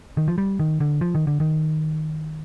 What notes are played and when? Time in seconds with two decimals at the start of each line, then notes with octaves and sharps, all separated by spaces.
0.17 D#3
0.28 F3
0.38 G3
0.59 D#3
0.80 D3
1.01 F3
1.15 D#3
1.27 D3
1.40 D#3